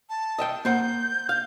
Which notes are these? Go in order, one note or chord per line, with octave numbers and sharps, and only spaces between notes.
A5
D#5 E5 G5
A#3 C5 F#5 G6
F5